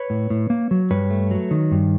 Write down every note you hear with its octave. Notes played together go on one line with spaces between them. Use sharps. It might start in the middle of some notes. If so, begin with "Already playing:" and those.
Already playing: B4 C#5
A2
A2
A#3
F#3
G2 B4 C#5
A3
F#3
D#3
G2